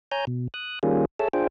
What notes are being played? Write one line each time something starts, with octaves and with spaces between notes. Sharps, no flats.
C#5 G#5 A#5 G6
B2
D#6 F#6
D#3 G3 A#3 C#4 F4 G#4
G#4 A4 C#5 E5 A5
D4 F4 G#4 C5 G5